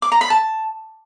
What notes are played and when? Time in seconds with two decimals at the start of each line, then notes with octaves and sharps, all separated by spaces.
0.02 D6
0.12 A#5
0.21 B5
0.30 A5